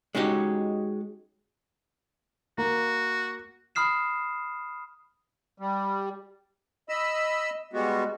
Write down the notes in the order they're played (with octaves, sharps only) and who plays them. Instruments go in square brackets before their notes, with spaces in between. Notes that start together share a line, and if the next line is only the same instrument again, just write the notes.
[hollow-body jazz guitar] G#3 C#4 D#4 F#4 G4
[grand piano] A#3 [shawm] F#4
[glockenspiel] B5 D#6 F6 C7 E7
[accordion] G3
D#5 B5 E6
G3 G#3 B3 F#4